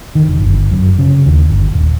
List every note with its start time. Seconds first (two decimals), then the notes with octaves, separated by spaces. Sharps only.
0.15 D#3
0.29 F1
0.40 G1
0.71 F#2
0.99 C#3
1.26 D#2
1.50 G1
1.73 D#1